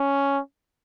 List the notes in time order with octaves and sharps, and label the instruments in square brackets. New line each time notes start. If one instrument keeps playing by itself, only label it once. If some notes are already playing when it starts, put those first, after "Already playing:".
Already playing: [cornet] C#4